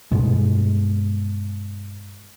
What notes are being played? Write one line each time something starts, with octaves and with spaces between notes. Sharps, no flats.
G2 B2 G#3